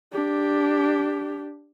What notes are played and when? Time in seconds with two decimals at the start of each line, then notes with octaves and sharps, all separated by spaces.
0.12 D4 G4